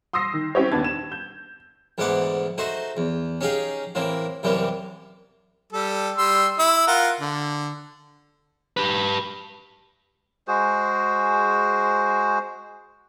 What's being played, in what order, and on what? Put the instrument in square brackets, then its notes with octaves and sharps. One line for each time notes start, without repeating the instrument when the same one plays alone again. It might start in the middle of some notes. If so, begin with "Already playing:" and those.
[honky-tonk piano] C6 D#6 E6 A#6 C7
D#3
C4 C#4 E4 G4 C5 C#5
D#2 B3 D4 A5 G#6
E7
G6
[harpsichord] D2 G#2 E3 B3 F#5 D6
A3 D#4 F#4 C5
E2
C#4 D#4 G4 G#4 F5
A2 E3 A#3 C4
C2 F#2 C3 E3 G3 A#3
[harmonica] G3 A4
G3 C6 E6
E4 E6
F4 A#4 F#5
D3
[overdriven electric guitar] G4 B4
[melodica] G#3 F#4 G#4 C5